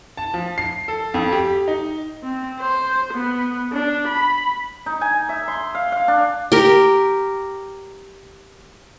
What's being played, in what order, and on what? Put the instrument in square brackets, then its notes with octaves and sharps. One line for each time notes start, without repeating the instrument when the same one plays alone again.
[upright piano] A5
F3
C7
A4
F2
G4
D#4
[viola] C4
C5
B3
D4
B5
[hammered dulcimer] D#4
G#5
E5
C6
F5
F5
D4
[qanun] G4 A#4